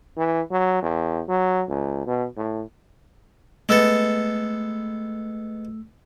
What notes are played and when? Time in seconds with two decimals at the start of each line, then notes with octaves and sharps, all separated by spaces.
0.17 E3
0.51 F#3
0.82 E2
1.29 F#3
1.69 C#2
2.06 B2
2.37 A2
3.69 G#3 A3 B3 A4 E6